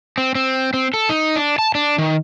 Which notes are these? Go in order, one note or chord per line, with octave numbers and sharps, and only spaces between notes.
C4
C4
C4
A4
D#4
D4
A5
D4
D#3